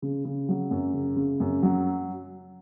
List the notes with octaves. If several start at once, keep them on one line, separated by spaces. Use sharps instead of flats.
C#3
C#3
F#3
F#2
C#3
C#3
F#2
F#3